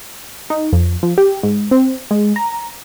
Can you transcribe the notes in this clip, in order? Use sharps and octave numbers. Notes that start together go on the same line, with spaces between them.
D#4
F2
F3
G4
G#2
C4
G#3
A#5